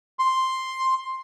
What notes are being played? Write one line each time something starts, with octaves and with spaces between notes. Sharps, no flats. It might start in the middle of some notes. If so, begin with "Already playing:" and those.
C6